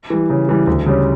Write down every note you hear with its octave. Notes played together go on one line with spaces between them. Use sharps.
E3 G3
C#3
E3 G3
D2
C#3 G3 C#4